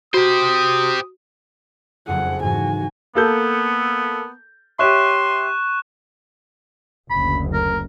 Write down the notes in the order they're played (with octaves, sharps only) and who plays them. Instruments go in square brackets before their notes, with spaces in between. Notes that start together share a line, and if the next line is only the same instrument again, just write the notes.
[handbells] F#4 [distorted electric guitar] G4 C5 [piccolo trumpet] D#6
[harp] F#1 F2 G#4 [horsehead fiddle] F#5
[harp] G#2 E3 [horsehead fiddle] F#4 G#5
[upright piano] A#3 A4 G6 [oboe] B3
[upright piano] G4 C#5 E5 [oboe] C6 [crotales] C#6 F#6 E7
[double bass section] F#1 D2 [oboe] B5
[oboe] A#4